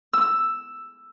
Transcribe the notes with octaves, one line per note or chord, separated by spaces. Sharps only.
E6